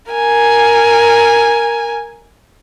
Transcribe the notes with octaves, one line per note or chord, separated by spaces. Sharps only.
A#4 G#5